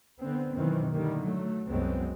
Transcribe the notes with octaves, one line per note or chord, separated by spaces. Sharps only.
D3 B3 C4
F#2 B2 D#3 E3 C4
A2 D3 D#3 G3 A#3
F#3 A3
C2 F#2 F#3 G#3 B3 C4